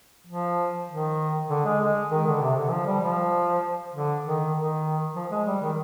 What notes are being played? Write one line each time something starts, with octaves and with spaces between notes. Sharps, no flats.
F3
D#3
D3
G#3
G#3
D#3
D3
C3
D3
F3
G3
F3
D3
D#3
D#3
F3
G#3
G3
D#3